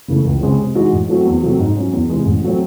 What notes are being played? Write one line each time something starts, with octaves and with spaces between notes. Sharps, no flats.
C#3 E3 A3
C#2
C#3 G#3 C4
C3
E3 G#3 D#4 F#4
A2
F#3 A3 C4 F#4
E2
C3 F#3 A3 C4
G#2
F#3 C#4
E2
C3 E3 G#3
A1
F#3 A3 C4